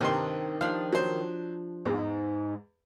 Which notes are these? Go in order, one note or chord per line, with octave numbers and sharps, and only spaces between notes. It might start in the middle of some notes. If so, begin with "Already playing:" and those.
C2 G2 D#3 C4 D4 D#4 C6
F3 D4 G4 F5
F#3 C5
E2 G#2